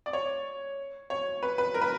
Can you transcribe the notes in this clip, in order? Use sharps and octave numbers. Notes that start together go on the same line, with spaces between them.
D5
C#5
C#5
B4
B4
A#4
B4